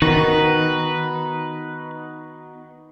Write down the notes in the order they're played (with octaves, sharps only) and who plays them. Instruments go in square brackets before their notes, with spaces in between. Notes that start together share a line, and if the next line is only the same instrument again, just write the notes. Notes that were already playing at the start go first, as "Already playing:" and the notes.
[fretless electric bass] D#3 [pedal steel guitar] B3 D#4 F#4 [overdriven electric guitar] B4